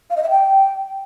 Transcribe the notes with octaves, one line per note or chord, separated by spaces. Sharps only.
F5
D#5
E5
G5